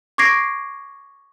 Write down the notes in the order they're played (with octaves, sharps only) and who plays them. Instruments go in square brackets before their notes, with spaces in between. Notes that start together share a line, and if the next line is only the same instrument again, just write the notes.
[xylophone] C#6 D6 G#6 A#6 C7 D7